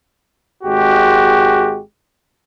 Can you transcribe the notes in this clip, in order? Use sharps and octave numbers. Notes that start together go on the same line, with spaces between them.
G#1 G#3 F#4 G4